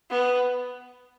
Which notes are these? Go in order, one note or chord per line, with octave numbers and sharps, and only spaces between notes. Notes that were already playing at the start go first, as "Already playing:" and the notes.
B3